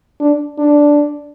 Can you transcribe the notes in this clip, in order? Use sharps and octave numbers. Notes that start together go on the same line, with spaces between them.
D4
D4